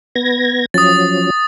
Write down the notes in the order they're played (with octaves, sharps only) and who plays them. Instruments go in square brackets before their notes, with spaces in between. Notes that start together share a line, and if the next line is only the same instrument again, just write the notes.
[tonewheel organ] B3 G#6 A#6
[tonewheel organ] F3 F#3 C#4 [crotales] D#6 A6